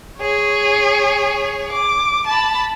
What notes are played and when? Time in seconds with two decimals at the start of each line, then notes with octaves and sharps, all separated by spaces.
0.18 G#4 C#5
1.71 D6
2.26 A5 B5